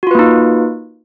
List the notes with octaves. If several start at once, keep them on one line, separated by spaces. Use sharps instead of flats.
A#3 D#4 F4 F#4 B4